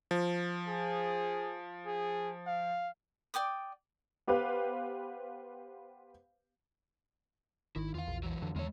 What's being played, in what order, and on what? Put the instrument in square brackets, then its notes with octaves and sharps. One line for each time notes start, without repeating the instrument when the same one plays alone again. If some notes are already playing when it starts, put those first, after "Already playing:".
[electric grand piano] F3
[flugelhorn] G#4
G#4
F5
[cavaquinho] D5 G5 D6 D#6
[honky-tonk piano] B3 G4 B4 C5 F5
[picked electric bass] G#1 [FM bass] D#3 [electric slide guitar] E4
[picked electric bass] E2 [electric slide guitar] F4 F5
[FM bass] A#1
[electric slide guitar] E3 F#3
[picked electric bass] F2 D3
[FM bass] E2 [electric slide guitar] G#3 C#5